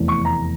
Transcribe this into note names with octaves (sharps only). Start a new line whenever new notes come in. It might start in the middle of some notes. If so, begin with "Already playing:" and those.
Already playing: F1 E2 E3 A3
C#6
A#5